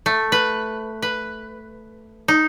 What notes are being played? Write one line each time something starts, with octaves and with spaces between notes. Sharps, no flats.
A3
B4
B4
D#4